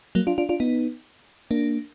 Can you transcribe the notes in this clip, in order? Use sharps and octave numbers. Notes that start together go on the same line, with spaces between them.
F#3 A#3
D4 F4
D4 F4
D4 F4
B3 D#4
A#3 D4